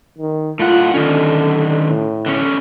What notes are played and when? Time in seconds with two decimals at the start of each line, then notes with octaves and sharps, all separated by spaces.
0.18 D#3
0.59 A2 F4 F#5
0.94 D3 D#3 C#4
1.89 A2
2.26 D3 C#4